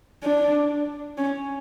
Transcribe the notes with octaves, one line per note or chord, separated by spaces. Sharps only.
D4
C#4